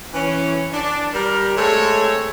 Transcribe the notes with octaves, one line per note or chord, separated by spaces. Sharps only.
E3 C#4
D4
G3 A#4
G#3 A3 C4 A4 C#5